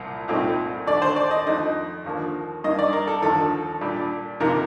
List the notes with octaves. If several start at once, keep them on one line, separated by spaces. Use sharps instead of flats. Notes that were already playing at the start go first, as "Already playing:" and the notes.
Already playing: C2 A#2 F3
C2 A#2 A3 C4 D#4
D#2 D3 A3 D4 D5
C5
D5
D#5
F2 D#3 A3 D4 D#5
D#2 D3 F3 A#3
G2 D#3 A#3 D#5
D5
A#4
A4
D#2 D3 F3 A4
A#2 G3 D4
F2 C3 D#3 A#3 A#4